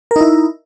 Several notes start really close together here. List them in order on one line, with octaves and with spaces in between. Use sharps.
A#4 D#4 E4